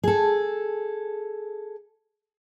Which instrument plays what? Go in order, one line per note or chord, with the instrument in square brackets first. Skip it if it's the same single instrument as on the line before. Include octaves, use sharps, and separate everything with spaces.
[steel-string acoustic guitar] G#4 A4